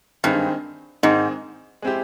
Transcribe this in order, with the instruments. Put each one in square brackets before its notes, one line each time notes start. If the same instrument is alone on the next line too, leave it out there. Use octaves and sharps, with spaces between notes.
[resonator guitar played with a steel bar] G2 [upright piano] D#3 G#3 C4 D#4
[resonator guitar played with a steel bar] G#2 [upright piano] D#3 G#3 C4 D#4
[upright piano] G#3 C4 E4 G4